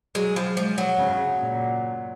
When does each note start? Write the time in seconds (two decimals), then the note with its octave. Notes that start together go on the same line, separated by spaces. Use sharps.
0.15 F#3 G#3
0.36 F3
0.57 F3 G#3
0.78 F#3
0.98 C#3
1.40 A#2